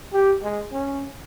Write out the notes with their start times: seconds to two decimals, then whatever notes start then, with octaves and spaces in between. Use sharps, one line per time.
0.13 G4
0.43 G#3
0.72 C#4